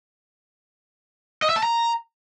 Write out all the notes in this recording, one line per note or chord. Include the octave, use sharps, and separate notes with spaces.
D#5
E5
A5
A#5